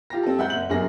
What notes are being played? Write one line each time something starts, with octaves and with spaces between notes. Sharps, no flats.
F4 G4 A#6
C4 A4
G#3 E5 F#5 G6
F#1 F#7
G1 F#2 G#4 A#6